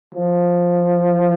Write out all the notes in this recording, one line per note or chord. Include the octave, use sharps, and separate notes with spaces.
F3